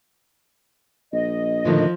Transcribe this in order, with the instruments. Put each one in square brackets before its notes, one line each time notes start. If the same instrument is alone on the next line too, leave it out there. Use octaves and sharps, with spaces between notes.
[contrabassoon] A#1 [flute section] D#5
[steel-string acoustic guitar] A2 D3 D#3 [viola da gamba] F3